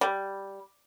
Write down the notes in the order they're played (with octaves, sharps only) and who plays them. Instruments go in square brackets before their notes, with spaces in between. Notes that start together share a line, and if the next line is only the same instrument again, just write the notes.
[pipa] G3